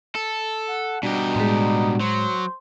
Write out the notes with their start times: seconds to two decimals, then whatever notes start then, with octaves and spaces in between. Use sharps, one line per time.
0.15 A4
0.69 F#5
1.03 B2 G3 D4 D#4 F#4 G4
1.36 A2 G#3
2.00 F#3 C5